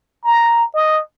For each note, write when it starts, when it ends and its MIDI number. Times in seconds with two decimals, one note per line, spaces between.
0.24 0.66 82
0.75 1.01 75